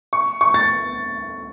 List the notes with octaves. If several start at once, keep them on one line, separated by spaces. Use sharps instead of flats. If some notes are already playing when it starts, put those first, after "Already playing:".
C#6
C#6
A6